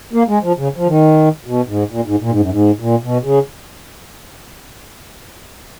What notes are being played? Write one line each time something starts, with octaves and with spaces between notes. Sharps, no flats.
A#3
G#3
F3
C#3
F3
D#3
B2
G#2
A#2
G#2
A#2
G#2
F#2
G#2
A#2
B2
C#3